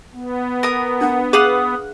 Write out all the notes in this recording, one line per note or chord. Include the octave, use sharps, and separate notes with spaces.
B3
A#4 D#6
D4 F#5
G#4 B4 F5 F#5 D#6